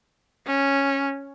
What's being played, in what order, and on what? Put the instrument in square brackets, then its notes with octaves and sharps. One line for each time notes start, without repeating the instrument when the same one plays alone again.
[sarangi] C#4